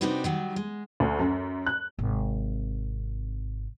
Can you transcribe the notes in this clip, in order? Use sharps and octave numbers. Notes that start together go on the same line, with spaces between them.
C3 C4 D4 D#4 F#4 B4
D#3 F#3 G3
G#3
D2
F#2
F#6
G#1 C3